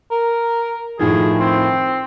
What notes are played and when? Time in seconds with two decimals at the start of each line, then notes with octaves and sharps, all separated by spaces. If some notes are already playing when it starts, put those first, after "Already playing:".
0.11 A#4
0.99 A2 D#3 F3 G#4
1.40 C4